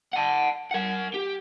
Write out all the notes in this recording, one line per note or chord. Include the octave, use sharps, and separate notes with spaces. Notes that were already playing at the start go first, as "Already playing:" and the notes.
F#5 A5
A#4 F#5
G4